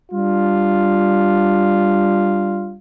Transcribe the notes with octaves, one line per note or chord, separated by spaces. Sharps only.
G3 D4 F4